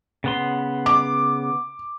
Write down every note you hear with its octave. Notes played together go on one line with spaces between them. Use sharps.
C#3 B3 C6
D6